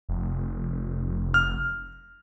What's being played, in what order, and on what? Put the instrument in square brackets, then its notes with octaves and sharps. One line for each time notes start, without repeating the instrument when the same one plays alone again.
[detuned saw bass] F1
[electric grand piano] F6